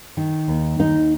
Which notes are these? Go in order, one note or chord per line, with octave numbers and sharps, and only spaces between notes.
D#3
D#2
D#2 D#4